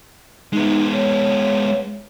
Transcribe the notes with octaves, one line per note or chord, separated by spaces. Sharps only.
G#3 B3 D#4
C#5